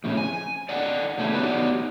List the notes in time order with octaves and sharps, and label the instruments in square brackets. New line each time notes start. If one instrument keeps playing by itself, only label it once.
[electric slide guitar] F2 A2 C#3
G#5
D5 D#5 F#5
C#3 A3 E4 G#4 B4
F#3 B3 D#4 F#4 G4 D5